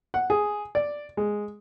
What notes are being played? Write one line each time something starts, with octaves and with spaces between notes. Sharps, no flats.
F#5
G#4
D5
G#3